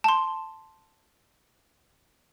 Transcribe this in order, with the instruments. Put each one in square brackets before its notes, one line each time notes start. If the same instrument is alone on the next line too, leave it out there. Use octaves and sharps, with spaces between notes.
[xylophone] A5 C6